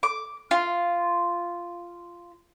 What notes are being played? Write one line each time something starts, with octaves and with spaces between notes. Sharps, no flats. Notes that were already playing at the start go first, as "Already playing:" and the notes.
D6
F4